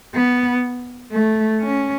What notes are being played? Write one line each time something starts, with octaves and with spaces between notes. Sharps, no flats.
B3
A3
C#4